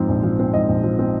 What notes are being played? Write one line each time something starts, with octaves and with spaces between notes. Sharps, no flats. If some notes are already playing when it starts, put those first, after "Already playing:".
Already playing: G#2 F3 C4
A#1
F3
C4
G#2 D#5
A#1
F3
C4